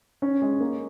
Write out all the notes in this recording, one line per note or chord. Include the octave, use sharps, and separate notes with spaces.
C#4
G#3
A#3